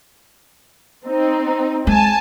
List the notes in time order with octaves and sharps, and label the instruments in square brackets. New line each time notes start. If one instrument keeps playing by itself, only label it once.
[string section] C4 D#4
[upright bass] G#3 [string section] G#5 A5